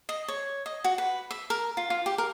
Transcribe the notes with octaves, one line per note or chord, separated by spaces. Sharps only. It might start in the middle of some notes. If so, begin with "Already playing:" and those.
D#5
C#5
D#5
F#4
B4
E5
A#4
F4
F4
G4
A#4